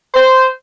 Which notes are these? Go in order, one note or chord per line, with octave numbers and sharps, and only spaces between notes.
C5